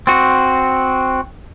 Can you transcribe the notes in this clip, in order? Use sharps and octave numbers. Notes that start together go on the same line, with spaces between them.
C4 F#4